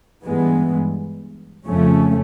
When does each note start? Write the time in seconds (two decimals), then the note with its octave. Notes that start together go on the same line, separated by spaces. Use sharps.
0.24 G2 E3 G#3 B3
1.66 F2 C#3 F3 A3 C#4